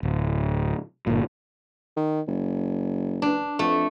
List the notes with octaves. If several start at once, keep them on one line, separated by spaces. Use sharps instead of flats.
D1
G1 A#2
D#3
F#1
D4
F2 A3